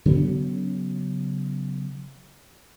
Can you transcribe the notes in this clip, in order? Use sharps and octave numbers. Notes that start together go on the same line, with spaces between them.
C#3 F#3 B3 C#4